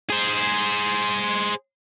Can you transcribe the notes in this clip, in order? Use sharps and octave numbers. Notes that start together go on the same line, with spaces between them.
G#4 C5